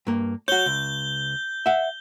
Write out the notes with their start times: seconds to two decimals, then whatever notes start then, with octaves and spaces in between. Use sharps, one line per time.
0.07 G2 A#3
0.48 F#4 C#5 G6 G7
0.66 C#2
1.66 E5 F#5